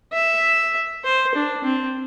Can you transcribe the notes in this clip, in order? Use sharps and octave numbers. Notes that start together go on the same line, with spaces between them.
E5
C5
D4
C4